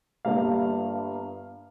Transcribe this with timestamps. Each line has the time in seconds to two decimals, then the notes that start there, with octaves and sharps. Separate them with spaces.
0.25 G1 G2 G3 A#3 F5